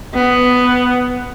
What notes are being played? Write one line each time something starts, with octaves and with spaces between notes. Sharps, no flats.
B3